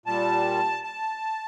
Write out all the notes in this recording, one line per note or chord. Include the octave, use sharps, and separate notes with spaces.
A#2 G3 A5
A5